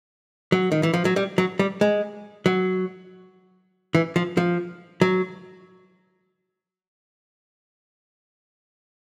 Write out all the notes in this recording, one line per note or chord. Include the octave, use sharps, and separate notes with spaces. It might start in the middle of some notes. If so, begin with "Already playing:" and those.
F#3
D#3
E3
F3
F#3
G3
F#3
G3
G#3
F#3
E3
F3
F3
F#3